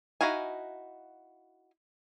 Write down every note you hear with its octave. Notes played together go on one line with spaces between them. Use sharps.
D#4 E4 F#4 F5 G#5